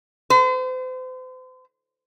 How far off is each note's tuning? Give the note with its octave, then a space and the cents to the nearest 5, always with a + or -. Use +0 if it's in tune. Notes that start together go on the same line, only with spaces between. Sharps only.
C5 -40